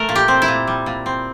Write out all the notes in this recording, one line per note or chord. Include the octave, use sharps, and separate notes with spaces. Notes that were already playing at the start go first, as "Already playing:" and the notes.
Already playing: A3 A#4
A#2
G4
C4
E4
A#2
G3
A#2
C4